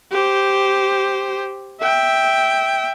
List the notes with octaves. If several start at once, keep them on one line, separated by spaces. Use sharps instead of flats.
G4 C5
E5 G5